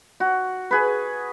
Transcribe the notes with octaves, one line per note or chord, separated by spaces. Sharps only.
F#4
G#4 B4